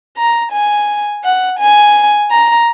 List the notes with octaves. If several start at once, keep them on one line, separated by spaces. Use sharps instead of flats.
A#5
G#5
F#5
G#5
A#5